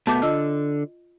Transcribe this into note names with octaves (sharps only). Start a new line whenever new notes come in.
B2 A3 B3 A5 D6 G6
D3 F4 D#5 E6